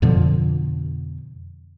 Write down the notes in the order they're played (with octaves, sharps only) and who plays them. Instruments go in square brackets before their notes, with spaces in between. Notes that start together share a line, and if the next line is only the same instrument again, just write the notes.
[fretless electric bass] F2 B2 D3 F3